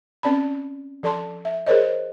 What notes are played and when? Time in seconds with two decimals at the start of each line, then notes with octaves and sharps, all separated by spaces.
0.23 C4 C#4 D5 A5 B5
1.03 F3 A4 D5 A5 C6
1.45 E5
1.67 G#4 A#4 C5 C#5 D#5